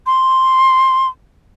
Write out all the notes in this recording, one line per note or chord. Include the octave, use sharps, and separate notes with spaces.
C6